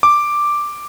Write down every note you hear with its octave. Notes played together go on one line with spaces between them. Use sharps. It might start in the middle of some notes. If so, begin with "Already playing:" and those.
D6